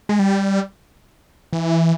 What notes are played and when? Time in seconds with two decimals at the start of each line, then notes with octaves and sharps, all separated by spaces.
0.09 G#3
0.19 G3
1.53 E3